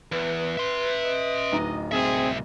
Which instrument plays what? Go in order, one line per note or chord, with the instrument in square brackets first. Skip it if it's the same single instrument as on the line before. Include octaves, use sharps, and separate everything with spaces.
[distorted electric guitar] E2 [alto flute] B4
[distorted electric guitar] E5 C6
[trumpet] D#5
[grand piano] D1 D#4
[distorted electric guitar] C2 E5 [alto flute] C4 [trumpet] G#4